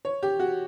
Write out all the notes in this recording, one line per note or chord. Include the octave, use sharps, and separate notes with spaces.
C#5
G4
F#4